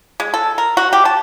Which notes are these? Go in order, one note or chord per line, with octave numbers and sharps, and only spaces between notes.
G#3
A4
A#4
F#4
G4
A5